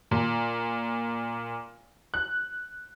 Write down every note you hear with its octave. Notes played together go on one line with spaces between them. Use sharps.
A#2
F#6